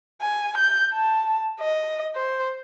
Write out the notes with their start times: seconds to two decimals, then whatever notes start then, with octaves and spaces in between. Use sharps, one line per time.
0.22 G#5
0.58 G6
0.94 A5
1.61 D#5
2.16 C5